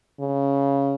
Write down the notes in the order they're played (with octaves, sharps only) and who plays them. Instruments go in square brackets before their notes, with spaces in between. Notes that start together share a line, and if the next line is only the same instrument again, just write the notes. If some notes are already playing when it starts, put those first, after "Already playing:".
[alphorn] C#3